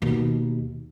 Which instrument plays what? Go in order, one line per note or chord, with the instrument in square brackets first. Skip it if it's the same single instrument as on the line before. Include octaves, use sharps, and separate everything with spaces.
[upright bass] D#2 B2